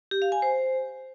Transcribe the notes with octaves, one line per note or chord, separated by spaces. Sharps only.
G4
F5
G#5
C5